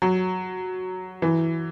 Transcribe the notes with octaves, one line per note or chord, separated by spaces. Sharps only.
F#3
E3